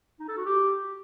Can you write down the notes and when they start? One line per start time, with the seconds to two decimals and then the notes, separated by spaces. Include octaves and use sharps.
0.20 D#4
0.29 A4
0.37 F#4
0.46 G4